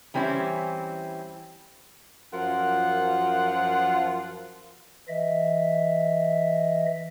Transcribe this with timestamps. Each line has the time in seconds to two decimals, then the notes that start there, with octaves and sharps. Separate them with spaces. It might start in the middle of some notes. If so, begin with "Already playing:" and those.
0.14 E3 G3 C4 C#4 E4
2.33 F#2 F3 F4 A#4 F#5
5.08 E3 D#5 E5